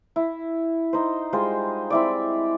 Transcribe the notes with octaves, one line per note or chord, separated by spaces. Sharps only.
E4
D#4 C5
G3 G#3 F4 C5
C4 E4 D5